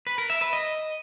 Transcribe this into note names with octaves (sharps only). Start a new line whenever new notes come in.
B4
A#4
E5
B4
D#5